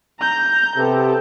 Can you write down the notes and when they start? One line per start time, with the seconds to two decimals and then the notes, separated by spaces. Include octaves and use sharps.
0.20 A#5 G6
0.76 C3 B3 G4 A4